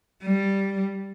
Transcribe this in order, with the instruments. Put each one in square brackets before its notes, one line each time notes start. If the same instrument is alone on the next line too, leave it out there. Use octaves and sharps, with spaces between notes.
[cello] G3